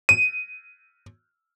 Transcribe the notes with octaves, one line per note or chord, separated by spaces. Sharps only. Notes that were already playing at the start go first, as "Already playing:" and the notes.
D#7